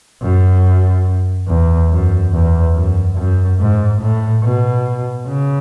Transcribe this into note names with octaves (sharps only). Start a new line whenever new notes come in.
F#2
E2
F#2
E2
F#2
F#2
G#2
A2
B2
C#3